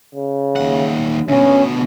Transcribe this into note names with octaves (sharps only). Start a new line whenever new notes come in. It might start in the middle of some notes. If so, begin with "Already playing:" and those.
C#3
D#2 F#5
D2 B2 C#4